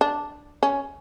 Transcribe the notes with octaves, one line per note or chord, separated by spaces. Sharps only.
D4
C#4